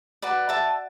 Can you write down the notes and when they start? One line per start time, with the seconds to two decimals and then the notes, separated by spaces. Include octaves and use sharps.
0.22 F#4 B4 D5
0.49 E5 A5